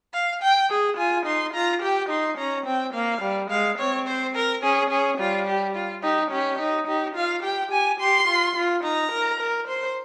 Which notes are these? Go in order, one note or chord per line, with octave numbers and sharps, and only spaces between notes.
F5
G5
G#4
F4 G#5
D#4 C6
F4 A#5
G4 G5
D#4 C6
C#4 A#5
C4 G5
A#3 F5
G3
G#3 F5
C4 C#5
C5
A#4
C#4 G#4
C#4 G#4
G3 F4
G4
F4
D#4 G4
C#4 G4
D#4
D#4 G4
F4 F5
G4 G5
G4 G#5
G4 C6
F4
F4
D#4 A#5
A#4
A#4
C5 C6